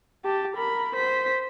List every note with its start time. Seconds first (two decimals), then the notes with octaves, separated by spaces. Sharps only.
0.25 G4 A5
0.56 A#4 B5
0.95 C5 B6